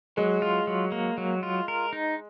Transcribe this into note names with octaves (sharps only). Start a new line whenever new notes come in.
F#3 G#3
F4
F#3
A#3
F#3
F4
A#4
D#4